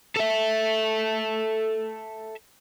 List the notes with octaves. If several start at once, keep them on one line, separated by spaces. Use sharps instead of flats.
A4 E5